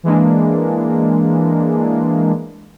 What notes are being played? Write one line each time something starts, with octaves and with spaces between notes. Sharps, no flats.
E3 G#3 A#3 D4